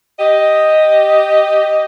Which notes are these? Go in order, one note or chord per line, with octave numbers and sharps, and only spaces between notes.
G4 D#5